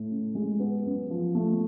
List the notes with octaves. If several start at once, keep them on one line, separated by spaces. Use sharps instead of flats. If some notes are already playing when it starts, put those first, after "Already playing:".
Already playing: A2
C#3
G#3
B3
F#2
F3
A3